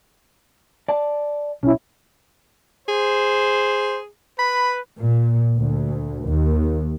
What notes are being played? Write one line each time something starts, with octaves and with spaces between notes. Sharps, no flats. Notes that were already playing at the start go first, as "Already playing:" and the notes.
D5 A5
B1 C#4 E4
G#4 C5
B4 B5
A#2
D2
D#2